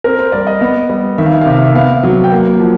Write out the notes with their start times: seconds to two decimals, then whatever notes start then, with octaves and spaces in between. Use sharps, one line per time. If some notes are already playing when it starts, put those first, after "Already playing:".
0.04 C4 A#4
0.19 C5
0.32 G3 D5
0.47 D#5
0.61 B3
0.90 G3
1.18 D#3 E5
1.26 F5
1.33 E5
1.41 F5
1.46 C3 E5
1.57 F5
1.64 E5
1.75 B3 F5
2.03 F#3
2.24 G5
2.32 A#3 F#5
2.59 F3